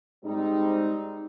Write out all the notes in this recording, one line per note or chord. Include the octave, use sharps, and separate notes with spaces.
G#2 G3 C4 D#4